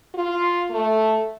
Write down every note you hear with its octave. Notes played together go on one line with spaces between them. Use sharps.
F4
A3